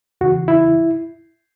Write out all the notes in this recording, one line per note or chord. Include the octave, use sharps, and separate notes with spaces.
E2 C#3 E3 F#4
E4